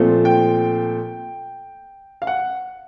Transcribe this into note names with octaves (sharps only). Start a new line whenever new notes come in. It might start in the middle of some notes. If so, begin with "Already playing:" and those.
Already playing: A#2 F3 A3 C4
G5
F5
F#5